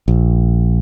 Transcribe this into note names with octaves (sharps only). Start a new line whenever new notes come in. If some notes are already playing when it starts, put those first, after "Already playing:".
A#1